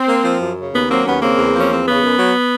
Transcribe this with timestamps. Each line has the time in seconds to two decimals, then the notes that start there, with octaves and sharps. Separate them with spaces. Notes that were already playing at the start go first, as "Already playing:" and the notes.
Already playing: C4
0.08 A#3
0.25 F3
0.41 F#2
0.58 C#3
0.74 D#2 B3
0.89 F#3 A#3 C4
1.05 D#2 B3 C#4
1.22 C#3 A#3 C4
1.38 E2
1.54 F3
1.60 C#4
1.71 E2 C4
1.87 C#3 B3
2.03 F#2
2.19 F#3